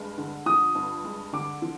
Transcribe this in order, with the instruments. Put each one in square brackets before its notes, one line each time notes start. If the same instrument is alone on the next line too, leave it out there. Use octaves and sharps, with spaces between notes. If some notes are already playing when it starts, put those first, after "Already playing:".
Already playing: [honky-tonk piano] G2 G#3
D3
[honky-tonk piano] F3 [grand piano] D#6
[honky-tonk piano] G2
G#3
[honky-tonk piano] D3 [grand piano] D6
[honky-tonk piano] F3